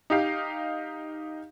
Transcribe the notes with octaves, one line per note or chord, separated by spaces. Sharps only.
D#4 G4 F5